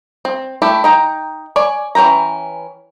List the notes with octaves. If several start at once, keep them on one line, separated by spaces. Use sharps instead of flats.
C4
A3 E4 G4 A4
D#4 G5 A#5
C#5 D5 G#5
E3 C#4 B4 G5 A#5